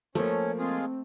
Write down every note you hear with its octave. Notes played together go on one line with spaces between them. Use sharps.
F3 A3 A#3 C#4 C#5
G#3 C4 F4 G#4